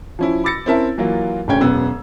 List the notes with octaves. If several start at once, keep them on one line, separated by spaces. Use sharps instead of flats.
F3 C#4 E4
B5 D6 E6 A6 A#6 C#7
C4 C#4 E4 A#4 E5 A5
E3 F#3 A#3 F4
G#1 D2 C#3 C#4 G5 G#6
E1 F#2 B3 E6